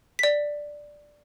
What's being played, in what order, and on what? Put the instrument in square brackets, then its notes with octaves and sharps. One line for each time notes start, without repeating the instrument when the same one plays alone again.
[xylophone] D5 B6